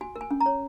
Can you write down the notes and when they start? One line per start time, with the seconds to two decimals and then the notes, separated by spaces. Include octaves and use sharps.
0.01 F#4 G#5
0.16 A#4
0.21 G#5
0.31 C#4
0.40 A#5
0.46 C#5